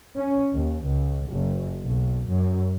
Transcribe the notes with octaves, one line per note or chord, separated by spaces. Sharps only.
C#4
D#2
C#2
F#1
B1
F#2